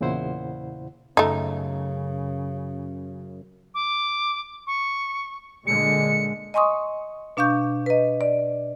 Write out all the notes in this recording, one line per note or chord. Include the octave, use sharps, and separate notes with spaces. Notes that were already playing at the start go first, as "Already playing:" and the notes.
E2 A#2 C#3 E4 C5 F#5
F#2 C#3 A3 D#4
D6
C#6
A#2 D3 G#3 C#7
D#5 G#5 C6 C#6 D#6
B2 D4 F5 C#6 G6
B4 D#5
D5